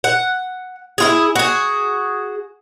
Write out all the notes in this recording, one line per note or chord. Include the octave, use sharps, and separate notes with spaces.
F#5
E4 F4 G#4
F#4 G#4